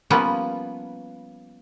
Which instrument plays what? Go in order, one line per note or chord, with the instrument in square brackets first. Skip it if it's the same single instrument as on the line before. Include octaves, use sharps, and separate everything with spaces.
[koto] F3 G3 A#3 B3 C#4